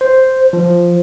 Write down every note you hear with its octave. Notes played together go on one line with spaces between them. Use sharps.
C5
F3